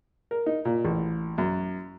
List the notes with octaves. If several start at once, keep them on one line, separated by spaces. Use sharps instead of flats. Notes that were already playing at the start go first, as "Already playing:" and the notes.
A#4
D#4
A#2
A1
F#2